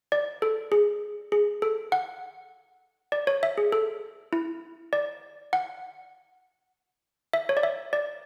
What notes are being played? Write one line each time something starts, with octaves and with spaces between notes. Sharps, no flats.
D5
A4
G#4
G#4
A4
F#5
D5
C#5
E5
G#4
A4
E4
D5
F#5
E5
C#5
D5
E5
D5